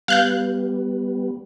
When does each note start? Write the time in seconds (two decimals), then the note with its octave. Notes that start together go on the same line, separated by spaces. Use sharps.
0.08 G3 B3 F5 F#6 G6